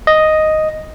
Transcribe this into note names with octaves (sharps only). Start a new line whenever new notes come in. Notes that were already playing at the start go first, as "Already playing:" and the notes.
D#5